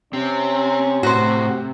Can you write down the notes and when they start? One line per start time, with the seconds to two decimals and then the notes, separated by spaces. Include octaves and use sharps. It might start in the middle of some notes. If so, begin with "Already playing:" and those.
0.13 C3 C4 C#4
1.03 A2 F#4 C5